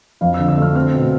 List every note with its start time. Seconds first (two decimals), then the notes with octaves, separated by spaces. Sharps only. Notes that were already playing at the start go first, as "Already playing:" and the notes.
0.21 F2 F5
0.34 E6
0.39 D3
0.48 E6
0.57 A3 F6
0.76 C4 F6
0.94 B2